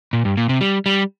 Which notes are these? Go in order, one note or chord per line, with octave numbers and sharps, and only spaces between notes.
A#2
G2
A#2
C3
G3
G3